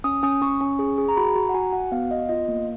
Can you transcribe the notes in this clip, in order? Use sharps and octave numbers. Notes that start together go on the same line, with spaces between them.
C#4 D#6
C#4 D#6
C#4 C#6
C#4
G#4
G#4
A#5
F#4 B5
F#4 A#5
F#5
F#4 G#5
F#4 F#5
B3 F5
B3 D#5
F4 D#5
A#3